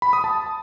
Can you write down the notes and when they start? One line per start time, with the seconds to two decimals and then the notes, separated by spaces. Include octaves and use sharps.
0.02 B5
0.13 D#6
0.24 A5